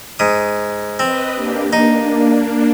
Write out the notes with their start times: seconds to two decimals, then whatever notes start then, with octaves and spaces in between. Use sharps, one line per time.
0.19 G#2 D#6
0.99 C4 B4 D#5
1.34 A#3 D4 G4
1.73 A#3 D4 D#4